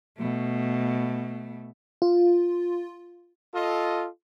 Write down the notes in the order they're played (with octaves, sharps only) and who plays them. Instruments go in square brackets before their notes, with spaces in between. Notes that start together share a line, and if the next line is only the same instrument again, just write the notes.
[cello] B2 A3
[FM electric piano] F4
[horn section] F4 A4 D#5